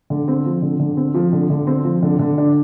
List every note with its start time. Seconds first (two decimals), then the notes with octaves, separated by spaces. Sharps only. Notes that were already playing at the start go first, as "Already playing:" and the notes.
0.10 D3
0.28 C4
0.45 F3
0.62 D3
0.80 D3
0.97 C4
1.14 F3
1.33 D3
1.50 D3
1.67 C4
1.84 F3
2.02 D3
2.19 D3
2.38 D4